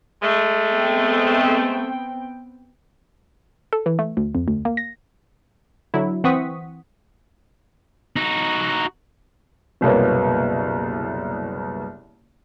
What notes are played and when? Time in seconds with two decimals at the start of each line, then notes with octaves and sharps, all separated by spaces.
0.23 G#3 A3
0.72 B3 C4 G5
3.73 A4
3.86 E3
3.99 A3
4.17 D2
4.35 F2
4.48 D2
4.65 A#3
4.77 A#6
5.94 D3 F#3 E4
6.24 E3 C4 F#5 C#6 D#6 B6
8.16 D#4 F#4
9.81 F#1 C2 B2 A#3 B3 C#5